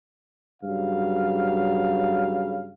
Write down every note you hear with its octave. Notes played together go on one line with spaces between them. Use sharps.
G2 C#3 F#3 F5